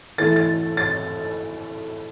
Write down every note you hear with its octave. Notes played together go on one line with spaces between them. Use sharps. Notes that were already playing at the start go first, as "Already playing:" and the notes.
E3 A3 E4 A6
A6
A6